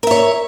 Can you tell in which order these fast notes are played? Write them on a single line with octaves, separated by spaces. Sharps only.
A#4 E5 C#5